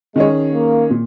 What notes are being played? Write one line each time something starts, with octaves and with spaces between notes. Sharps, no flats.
D#3 G#3 C#4 G#4 C#5
A#3
A#2